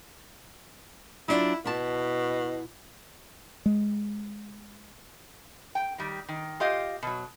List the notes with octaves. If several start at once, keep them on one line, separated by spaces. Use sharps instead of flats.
F#3 D4 E4 F4
B2 E4 A5
G#3
G5
D#3 G3
D#3
F4 G4 D#5 F5
B2 F#3